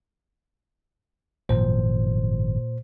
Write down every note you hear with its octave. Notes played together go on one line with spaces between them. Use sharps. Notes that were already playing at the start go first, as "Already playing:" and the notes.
G#1 F#2 A#2 F3 C5